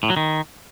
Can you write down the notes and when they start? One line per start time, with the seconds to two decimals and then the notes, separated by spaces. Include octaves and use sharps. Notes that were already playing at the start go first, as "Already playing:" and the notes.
0.03 A2
0.10 F#3
0.17 D#3